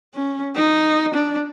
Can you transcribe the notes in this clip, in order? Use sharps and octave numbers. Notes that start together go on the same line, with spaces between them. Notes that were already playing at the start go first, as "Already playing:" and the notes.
C#4
D#4
D4